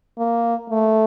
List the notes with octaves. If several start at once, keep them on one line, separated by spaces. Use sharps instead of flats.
A#3
A3